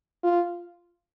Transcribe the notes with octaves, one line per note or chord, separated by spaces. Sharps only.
F4